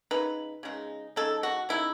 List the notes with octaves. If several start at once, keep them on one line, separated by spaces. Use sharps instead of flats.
C#3 G#3 D#4 B4
C#3 G#3 D#4
C#3 G#3 D#4 A4
F#4
C#3 G#3 D#4 E4